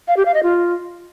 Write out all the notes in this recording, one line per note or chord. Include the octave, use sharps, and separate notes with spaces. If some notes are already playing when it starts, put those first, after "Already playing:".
F5
G4
F5
D#5
F4